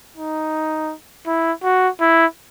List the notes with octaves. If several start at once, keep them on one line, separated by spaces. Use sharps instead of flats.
D#4
E4
F#4
E4